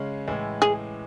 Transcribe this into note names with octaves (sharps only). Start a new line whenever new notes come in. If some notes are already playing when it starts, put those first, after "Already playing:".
Already playing: C#3 G#3 C#4
A2 E3 G#3
G#4